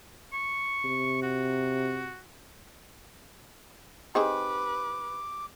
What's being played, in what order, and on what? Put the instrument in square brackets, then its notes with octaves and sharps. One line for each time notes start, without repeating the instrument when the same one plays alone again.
[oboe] C#6
[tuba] C3
[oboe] F#4
[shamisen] C4 D#4 G#4 [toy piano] G4 [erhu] B4 [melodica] D6